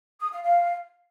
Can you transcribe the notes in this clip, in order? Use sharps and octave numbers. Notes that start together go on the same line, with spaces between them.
D#6
F5
F5